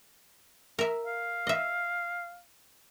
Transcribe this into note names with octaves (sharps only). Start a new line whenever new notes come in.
A#4 E5
F5
D#5 E5